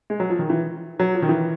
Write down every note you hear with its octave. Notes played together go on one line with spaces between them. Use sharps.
G#3
F#3
F3
D#3
E3
F#3
F3
D#3
E3